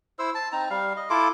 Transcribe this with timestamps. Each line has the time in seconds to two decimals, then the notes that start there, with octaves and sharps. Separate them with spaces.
0.19 E4 C5 E6
0.35 A5
0.53 C4 D#4 A#5
0.70 G3 F5
0.97 D#5
1.10 E4 F4 A4 D6